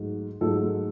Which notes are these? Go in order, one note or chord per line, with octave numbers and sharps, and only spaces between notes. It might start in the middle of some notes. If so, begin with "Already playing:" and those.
Already playing: G#2 F#3 A3
G#2 F#3 A3 A4